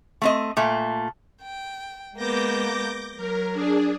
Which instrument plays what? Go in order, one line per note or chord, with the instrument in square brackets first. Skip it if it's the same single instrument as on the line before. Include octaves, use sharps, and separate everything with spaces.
[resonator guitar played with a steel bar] A3 C4 D#5
A#2 A3
[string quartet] G5
[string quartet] G#3 A#3 B3 [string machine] D6 G6 A#6
[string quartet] F#3 [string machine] A#4
[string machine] D4 G#4